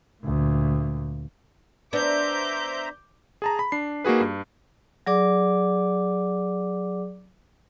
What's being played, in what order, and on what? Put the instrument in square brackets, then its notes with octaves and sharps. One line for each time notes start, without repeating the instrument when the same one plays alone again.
[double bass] D2 A#2
[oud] B3 D4 [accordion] C5 E5 A#5 [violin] D6 G6
[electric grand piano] G#4 A5 A#5
B5
D4 C7
A#3 D#4 F#4 G#4 B4
G2
[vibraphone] F#3 G#4 D5 D6